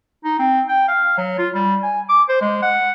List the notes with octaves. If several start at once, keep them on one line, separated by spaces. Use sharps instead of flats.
D#4
C4
G5
F5
F#3
F4
G3
G#5
D6
C5
G#3
F#5